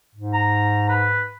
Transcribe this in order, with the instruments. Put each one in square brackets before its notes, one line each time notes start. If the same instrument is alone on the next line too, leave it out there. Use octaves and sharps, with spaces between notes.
[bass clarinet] G#2
[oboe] A#5
B4